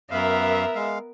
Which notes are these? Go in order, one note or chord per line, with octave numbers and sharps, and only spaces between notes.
F#2 B3 A#4 E5 F5
G#3 F5